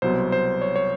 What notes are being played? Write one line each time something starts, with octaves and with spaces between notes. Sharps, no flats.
C2 B2 F#3 B3 C5
C5
C#5
C#5